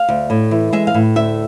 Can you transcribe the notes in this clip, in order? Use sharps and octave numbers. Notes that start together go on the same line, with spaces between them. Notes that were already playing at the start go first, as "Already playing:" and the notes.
Already playing: F5
D2
A2
E3
G#3 E5
F5
A2
D2 E5